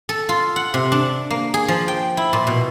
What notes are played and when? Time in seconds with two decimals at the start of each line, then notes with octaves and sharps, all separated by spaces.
0.09 A4
0.29 F4
0.56 F#5
0.74 C3
0.92 D4
1.30 A#3
1.54 G#4
1.68 F3
1.88 G5
2.17 E4
2.33 A#2
2.47 B2